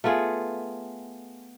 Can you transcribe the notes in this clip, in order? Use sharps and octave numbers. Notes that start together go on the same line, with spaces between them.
A3 B3 F4 G#4